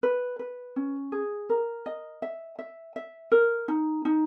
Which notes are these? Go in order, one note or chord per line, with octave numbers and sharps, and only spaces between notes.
B4
B4
C#4
G#4
A#4
D#5
E5
E5
E5
A#4
D#4
D#4